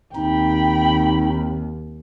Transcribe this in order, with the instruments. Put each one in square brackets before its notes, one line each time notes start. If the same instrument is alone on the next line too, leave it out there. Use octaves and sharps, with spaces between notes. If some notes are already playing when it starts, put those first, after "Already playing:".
[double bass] D#2 [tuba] C4 [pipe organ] D#4 [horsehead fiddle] G5 B5